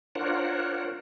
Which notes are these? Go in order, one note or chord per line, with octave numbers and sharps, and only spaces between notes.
D4 F4 A#4 C5 C#5 F#5